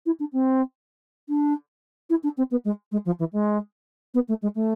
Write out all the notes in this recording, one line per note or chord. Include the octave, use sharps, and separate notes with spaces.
E4
D4
C4
D4
E4
D4
C4
B3
G#3
G#3
F3
E3
G#3
B3
A3
G#3
A3